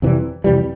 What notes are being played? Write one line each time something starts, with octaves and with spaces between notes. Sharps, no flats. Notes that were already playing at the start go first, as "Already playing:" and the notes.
F2 C3 E3 G3
F2 C3 E3 G3